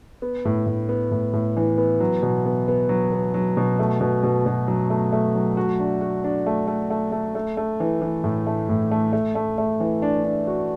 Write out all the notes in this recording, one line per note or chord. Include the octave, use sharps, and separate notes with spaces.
B3
A2
A2
B3
A2
A2
E3
B3
F#3
B2
B3
B3
F#3
B3
F#3
B2
A3
B2
B2
B2
F#3
A3
A3
F#3
F#4
D4
F#4
D4
A3
A3
A3
A3
A3
A3
E3
E3
A2
A3
A2
A3
A3
A3
A3
E3
D4
D4
F#4